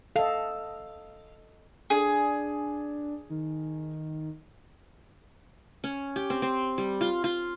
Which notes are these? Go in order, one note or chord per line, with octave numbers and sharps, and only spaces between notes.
A4 D#5 F5
D4 G#4
D#3
C#4
G4
C4
C4
G3
F4
F4